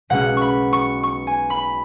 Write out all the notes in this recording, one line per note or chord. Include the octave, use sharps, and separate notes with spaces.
B1 B2 G#3 C#4 F#5
B5 C#6
C#6
C#6
G#5
B5